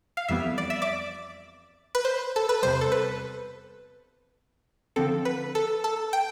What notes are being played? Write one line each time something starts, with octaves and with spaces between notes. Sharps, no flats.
F5
F2 E3 G3 B3 E5
D5
E5
D5
B4
C5
A4
B4
E2 C3 G3 C5
A4
B4
D3 F3 C4 A4
B4
A4
A4
G5